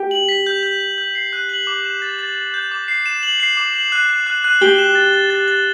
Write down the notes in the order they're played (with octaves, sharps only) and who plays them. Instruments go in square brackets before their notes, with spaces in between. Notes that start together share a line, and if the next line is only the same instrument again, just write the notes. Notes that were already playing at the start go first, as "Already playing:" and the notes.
Already playing: [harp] G4
[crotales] F#7
B6
G6
G6
G6
G6
C7
F#6
F#7
D6
E7
A6
A6
A6
G6
D6
C7
E7
F#7
C7
D6
F#7
F#6
F#6
F#6
F#6
[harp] G4 [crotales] G7
[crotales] E7
A6
A6
A6
A6